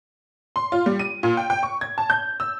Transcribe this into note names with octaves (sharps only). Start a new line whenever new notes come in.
C6
F4
G3
D#7
A#2
G5
G5
C#6
G#6
A5
G6
E6